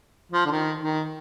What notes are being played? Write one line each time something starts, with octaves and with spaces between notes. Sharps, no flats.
F3
D3
D#3
D#3